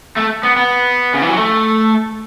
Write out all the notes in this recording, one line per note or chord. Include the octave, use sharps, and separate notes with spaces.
A3
B3
B3
C#3
E3
F#3
A3